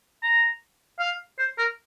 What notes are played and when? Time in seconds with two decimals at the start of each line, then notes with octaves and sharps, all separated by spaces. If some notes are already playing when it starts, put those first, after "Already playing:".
0.23 A#5
0.99 F5
1.38 C5
1.58 A#4